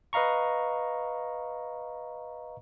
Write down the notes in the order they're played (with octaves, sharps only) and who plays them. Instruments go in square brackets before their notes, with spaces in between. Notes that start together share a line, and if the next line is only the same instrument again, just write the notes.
[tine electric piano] B4 D#5 F5 A#5 C#6